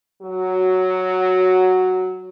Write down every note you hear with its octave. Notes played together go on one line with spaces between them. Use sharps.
F#3 F#4